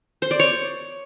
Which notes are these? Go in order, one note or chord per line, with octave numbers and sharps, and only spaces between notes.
C5
D5
C#5